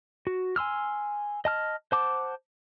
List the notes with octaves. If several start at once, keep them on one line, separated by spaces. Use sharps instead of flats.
F#4
G#5 C6 E6 F6
D#5 A5 F6
C5 F#5 A5 D6